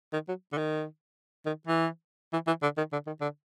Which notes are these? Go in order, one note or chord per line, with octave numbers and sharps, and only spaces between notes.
D#3
F#3
D3
D#3
D#3
E3
E3
E3
D3
D#3
D3
D#3
D3